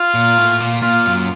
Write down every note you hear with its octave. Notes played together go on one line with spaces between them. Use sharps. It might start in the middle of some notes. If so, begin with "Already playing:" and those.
Already playing: F4
A#2
A2
A#2
A#2 F4
F#2